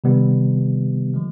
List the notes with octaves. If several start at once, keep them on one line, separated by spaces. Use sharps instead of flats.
C3 D#3 G3 B3
D3 F3 G#3